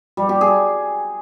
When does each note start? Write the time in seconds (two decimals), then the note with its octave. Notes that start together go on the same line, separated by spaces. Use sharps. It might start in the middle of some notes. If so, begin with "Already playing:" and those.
0.17 G3
0.29 G4
0.41 G#4